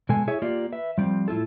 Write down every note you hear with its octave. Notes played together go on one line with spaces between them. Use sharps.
B2 G#3 A4 G#5
E4 G#4 C#5 E5
A#3 F4 G4 D5
B4 E5
F3 G3 A#3 C4
A2 E4 F4 A4